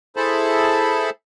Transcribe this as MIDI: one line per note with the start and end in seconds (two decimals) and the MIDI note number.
0.17 1.10 64
0.17 1.10 68
0.17 1.10 69
0.17 1.10 72
0.17 1.10 81
0.17 1.10 83